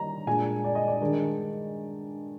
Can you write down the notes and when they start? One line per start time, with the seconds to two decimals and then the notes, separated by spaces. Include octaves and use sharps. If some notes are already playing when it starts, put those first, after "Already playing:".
Already playing: D#3 G3 A#3 D4 A#5
0.26 A#2 G#3 D4 G#5
0.64 D5
0.75 D#5
0.88 D5
1.01 G2 D#3 G#3 D4